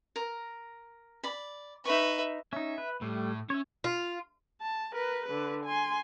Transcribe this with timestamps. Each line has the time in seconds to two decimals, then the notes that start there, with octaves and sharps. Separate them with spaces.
0.16 A#4
1.24 D5 B5
1.85 D#4 B4 E5 C#6
2.53 C#4 D#4 E5
2.78 B4
3.02 A2 G3 A3
3.50 C#4 C#5 E5
3.84 F4
4.61 A5
4.93 A#4 B4
5.26 D3 B4
5.65 G#5 C6